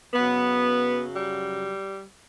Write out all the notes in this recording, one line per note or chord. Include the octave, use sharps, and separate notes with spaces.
F#2 C#3 F#3 B3
G3